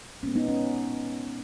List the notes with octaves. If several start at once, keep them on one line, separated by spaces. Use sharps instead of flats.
A#2 G#3 B3 C#4
B3 D#4
C#4